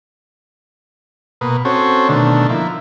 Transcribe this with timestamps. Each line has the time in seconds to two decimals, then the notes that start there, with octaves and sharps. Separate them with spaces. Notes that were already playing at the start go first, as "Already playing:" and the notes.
1.41 B2 A#3 B4 D#6
1.65 C4 C#4 F#4 A4 C5 C#5
2.09 B2 D3 D#3 A3 D4
2.49 F3 A#3 E4